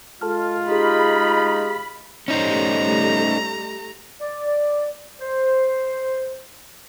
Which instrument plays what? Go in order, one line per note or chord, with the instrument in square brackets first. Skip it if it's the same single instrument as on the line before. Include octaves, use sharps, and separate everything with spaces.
[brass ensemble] G#3 F4 [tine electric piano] A4 A5 F6
[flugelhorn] D#4 [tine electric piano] G4 G#4 [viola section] B5
[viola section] G3 A3 [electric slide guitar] C#4 D#4 C5 [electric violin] A#5
[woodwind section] D5
C5